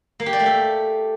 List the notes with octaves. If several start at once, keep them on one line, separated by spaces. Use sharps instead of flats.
A#3
G4
D5
A3
A4